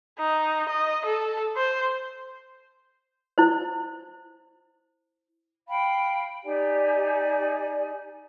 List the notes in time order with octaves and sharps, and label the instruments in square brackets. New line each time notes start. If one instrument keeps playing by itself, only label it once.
[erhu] D#4
D#5
A4
C5
[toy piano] E4 C5
[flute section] F5 G5 B5
D#4 G4 D5 G#5